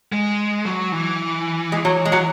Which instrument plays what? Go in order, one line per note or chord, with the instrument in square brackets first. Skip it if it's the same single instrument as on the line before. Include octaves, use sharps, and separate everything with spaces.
[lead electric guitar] G#3
F#3
E3
[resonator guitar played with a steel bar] G#3
F#3
G#3
F#3